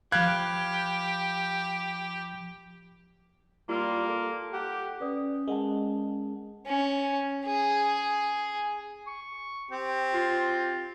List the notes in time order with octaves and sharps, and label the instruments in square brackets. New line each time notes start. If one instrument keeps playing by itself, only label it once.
[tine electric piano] F3 B5 [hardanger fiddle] G4 [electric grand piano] F5 F#6 G#6
[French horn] G3 [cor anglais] A#3 [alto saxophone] F4
[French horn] A4
[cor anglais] G4 [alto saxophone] F#5
[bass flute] C#4 [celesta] B4 D5 D#6
[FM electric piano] G#3 [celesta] A#4 F#5 A5
[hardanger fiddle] C#4
G#4
[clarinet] C#6
[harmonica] C4 G4
[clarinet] F4